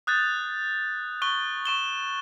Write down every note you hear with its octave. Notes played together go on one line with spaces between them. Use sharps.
D#6 F#6 G6 A6
C#6 F#6 G7
C#6 E7 G7